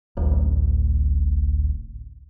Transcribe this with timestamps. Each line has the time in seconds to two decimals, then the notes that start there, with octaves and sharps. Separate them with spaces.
0.17 D1 A1